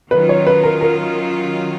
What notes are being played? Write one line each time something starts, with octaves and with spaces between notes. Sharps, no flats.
D#3 F#3 C#4 F4 B4
C#5
B4
A#4
A#4